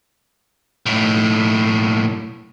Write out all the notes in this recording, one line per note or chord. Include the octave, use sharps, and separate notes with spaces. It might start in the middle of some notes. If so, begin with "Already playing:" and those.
B1 A2